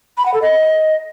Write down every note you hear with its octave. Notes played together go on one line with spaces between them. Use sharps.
B5
F#5
A4
D#5